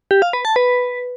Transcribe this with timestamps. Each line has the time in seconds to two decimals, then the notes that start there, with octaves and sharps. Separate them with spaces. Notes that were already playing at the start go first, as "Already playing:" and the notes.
0.11 G4
0.22 F5
0.33 B4
0.45 A5
0.56 B4